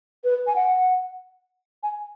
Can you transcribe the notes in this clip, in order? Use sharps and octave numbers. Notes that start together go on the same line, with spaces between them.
B4
G#5
F#5
G#5